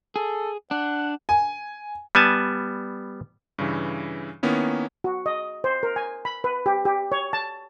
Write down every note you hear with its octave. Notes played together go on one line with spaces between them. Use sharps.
G#4 A4
D4 F#5
G#5
G3 B3 G#5 A5
G2 C#3 E3
D#3 A#3 B3 C#4 E4
F#4
D#5
C5
A#4
G#5
B5
B4
G4
G4
C#5
A5